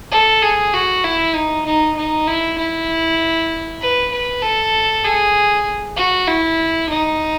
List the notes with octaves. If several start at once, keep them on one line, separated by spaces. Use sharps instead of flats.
A4
G#4
F#4
E4
D#4
D#4
D#4
E4
E4
B4
B4
A4
G#4
F#4
E4
D#4